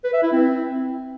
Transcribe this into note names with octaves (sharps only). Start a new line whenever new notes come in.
B4
E5
E4
C4